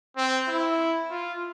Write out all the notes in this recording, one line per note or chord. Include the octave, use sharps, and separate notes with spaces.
C4
E4
F4